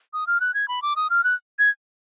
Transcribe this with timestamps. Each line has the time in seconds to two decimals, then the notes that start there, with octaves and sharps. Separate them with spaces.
0.13 D#6
0.27 F6
0.40 F#6
0.54 G#6
0.68 B5
0.82 D6
0.96 D#6
1.10 F6
1.24 F#6
1.59 G#6